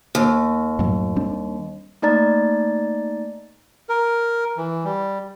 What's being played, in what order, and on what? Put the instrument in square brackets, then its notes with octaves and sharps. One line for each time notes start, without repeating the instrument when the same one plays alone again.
[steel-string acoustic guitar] D#2
[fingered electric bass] F#2 A2 F#3
G3 C4 D4
[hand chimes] A3 A#3 D#4 D5 A#5 A6
[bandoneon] A#4
E3
G3